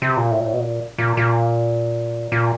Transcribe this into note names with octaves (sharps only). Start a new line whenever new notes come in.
C3
A#2
A2
A#2
A2
B2
A#2
A#2
A#2
A#2